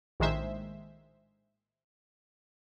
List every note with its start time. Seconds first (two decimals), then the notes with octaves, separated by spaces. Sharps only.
0.20 A#1 A2 D#3 G#3 C5 E5